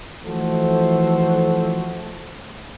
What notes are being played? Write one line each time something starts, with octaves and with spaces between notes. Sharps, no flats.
E3 F3 A3 F#4 A4 C5